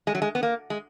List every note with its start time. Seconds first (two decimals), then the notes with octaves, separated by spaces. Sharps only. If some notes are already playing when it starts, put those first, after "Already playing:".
0.07 G#3
0.15 F#3
0.22 G#3
0.35 B3
0.43 A#3
0.70 G#3